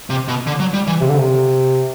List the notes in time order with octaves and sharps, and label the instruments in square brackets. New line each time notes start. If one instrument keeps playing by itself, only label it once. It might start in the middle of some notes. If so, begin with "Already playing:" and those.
[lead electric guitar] C3
B2
D3
F#3
G3
E3
[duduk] C3
D3
C3